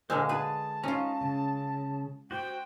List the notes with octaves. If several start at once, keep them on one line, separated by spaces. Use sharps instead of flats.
A#2 D3 G#3 A#4 C5 E6 F6
G#4 B4 A5 D#6
C#4 D#4 F4 A#5
C#3
F#4 C5 G5